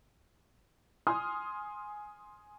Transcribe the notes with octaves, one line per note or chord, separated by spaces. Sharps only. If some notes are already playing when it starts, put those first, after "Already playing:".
G#5 C6 D#6 F6